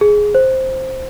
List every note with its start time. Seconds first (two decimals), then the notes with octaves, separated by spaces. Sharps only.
0.01 G#4
0.35 C5